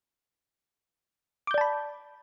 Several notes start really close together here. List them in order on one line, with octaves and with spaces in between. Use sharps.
D6 G6 D5 A5 B5